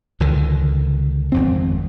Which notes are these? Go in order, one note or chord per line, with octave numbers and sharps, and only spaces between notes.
C#2 D3 D#3
G#1 F2 C4